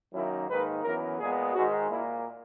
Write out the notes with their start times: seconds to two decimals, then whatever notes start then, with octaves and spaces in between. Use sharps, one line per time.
0.14 F#2 D#3 F#3 A#3 E4
0.49 G#2 D#3 A#3 B4
0.84 F#2 E3 B3 A#4
1.19 A#2 G#3 B3 G#4
1.54 G#2 D#3 G#3 F#4
1.90 A#2 A#3 E4